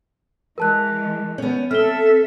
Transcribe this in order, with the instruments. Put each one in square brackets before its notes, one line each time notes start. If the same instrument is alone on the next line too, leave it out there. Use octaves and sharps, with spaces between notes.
[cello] E3 G#3 [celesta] A#4 A5 F#6
[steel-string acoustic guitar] B3 C#4 [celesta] C#5
[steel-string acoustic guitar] C4 [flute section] A4 [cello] E5 [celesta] F6 G7